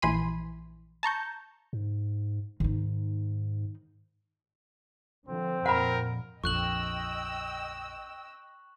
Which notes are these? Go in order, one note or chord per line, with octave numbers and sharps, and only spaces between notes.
A#1 E3 G#5 B5 C6 D#7
A5 A#5 C#6 G6
G#2
G#2 D#3 D#4
D3 F3 C4
F2 A#2 A#4 F#5 B5
A#1 F2 D#5 G5 C#6 E6 F#6 F#7